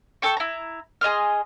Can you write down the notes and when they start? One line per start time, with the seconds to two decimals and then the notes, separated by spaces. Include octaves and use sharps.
0.22 A4 G5 C#6
0.37 E4 A#5
1.01 G#4 D#5 C6 F6